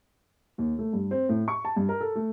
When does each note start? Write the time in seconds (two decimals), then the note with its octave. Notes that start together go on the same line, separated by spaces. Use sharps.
0.58 D#2
0.79 A3
0.93 G2
1.11 C4
1.29 A2
1.48 C#6
1.65 A5
1.76 G2
1.89 A#4
2.01 A4
2.15 A3